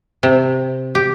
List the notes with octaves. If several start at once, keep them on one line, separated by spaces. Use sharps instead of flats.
C3
G4